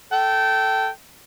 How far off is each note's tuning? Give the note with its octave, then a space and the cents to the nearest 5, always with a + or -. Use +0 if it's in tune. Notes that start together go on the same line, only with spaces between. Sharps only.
A4 +0 G5 -20